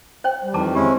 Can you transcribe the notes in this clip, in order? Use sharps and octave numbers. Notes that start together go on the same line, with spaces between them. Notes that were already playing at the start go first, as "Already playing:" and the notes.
C5 C#5 G5
G3
F2 D#3 E3 A5 A#5 D6
G#3 C4 C#4 E4 G4